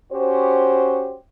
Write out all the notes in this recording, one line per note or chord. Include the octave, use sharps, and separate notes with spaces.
C#4 F#4 G4 C5